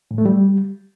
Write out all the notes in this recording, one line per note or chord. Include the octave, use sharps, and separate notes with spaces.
A2
A3
G3